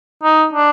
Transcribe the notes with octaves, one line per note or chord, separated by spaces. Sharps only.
D#4
D4